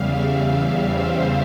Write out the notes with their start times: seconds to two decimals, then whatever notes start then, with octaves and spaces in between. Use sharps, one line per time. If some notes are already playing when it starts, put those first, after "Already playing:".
Already playing: E2 C#3 G3 E5 F5
0.39 E5
0.87 C5